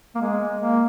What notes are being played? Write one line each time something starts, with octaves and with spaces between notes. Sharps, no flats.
A#3
G#3
A#3